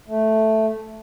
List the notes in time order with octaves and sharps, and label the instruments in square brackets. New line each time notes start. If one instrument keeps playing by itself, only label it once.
[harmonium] A3